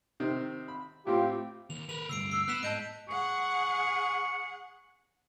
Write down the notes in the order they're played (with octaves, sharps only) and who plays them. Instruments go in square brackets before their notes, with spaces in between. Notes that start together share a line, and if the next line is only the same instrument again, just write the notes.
[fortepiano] C3 D#3 C4
B5
[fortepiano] A2 C4 [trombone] F4 [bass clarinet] G4
[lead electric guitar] D#2 [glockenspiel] F7
[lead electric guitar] A#4 B4 [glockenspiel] F7
[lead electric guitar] D2 G2 [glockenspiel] E6 C7 D7
[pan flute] E6 [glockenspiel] C7
[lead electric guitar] B3 [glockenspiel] F#6 B6 E7
[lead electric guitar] G#2 [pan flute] D#5 [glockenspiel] A5 G6 D7
[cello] G#4 F#5 [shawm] C#6